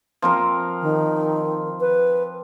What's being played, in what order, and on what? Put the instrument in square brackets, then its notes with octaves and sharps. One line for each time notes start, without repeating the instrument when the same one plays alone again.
[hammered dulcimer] F3 C4 A#4
[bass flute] D#3
B4